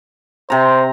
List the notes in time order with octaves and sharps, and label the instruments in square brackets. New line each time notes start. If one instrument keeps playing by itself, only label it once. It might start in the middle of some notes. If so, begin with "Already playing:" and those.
[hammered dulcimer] C3 A#5 [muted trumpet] C5